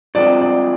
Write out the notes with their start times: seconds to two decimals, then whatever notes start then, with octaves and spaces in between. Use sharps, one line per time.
0.15 G2 F3 G#3 C4 D5
0.41 D5